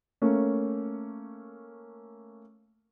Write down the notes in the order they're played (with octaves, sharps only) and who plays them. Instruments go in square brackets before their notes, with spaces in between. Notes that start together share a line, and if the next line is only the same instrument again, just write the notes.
[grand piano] A3 A#3 C#4